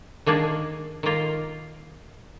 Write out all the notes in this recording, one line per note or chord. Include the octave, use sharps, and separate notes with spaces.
D#3 A#3 D4 G#4
D#3 A#3 F4